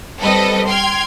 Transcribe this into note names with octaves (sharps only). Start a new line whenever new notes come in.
G3 C4 A4 B4 D#5
G5 C6 F6 G#6